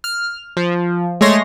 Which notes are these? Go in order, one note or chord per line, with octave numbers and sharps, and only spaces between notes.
F6
F3
G#3 A3 C#5 C6 A#6